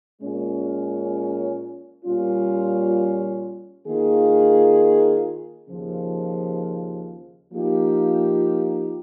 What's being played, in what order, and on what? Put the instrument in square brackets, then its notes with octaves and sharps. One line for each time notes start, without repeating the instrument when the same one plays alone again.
[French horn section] A#2 G#3 C#4
A#2 G3 C#4 F4
D#3 A#3 F4 G#4
D#2 C#3 F3
F3 A#3 D#4 G4